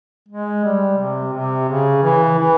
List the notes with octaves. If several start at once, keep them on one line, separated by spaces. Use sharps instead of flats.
G#3
G3
C3
C3
C#3
E3
E3